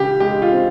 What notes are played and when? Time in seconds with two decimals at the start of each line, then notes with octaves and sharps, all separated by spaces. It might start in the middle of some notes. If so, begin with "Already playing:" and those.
Already playing: C#2 C#3 G4
0.20 G#3 G4
0.42 F4
0.52 C4